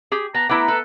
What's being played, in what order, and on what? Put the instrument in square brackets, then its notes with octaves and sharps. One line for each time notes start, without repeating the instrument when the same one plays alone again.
[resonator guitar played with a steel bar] G4 G#4
[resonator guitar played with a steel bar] B3 [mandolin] A5 [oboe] A#5
[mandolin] A3 A#5 [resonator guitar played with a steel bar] B3 E4 [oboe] D6
[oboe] A4 [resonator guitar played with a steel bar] B4